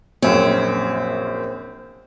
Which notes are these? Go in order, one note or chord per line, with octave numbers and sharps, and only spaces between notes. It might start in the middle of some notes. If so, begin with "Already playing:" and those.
A#1 F#2 C4 C#5